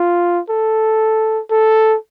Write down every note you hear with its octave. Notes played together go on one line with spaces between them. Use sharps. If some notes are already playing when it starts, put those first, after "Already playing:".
Already playing: F4
A4
A4